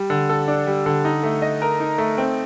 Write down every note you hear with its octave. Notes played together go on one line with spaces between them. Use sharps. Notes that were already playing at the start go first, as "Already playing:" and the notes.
Already playing: G3
D3
A4
D4
G3
D3
D#4
A3
D#5
A#4
D#4
A3
C4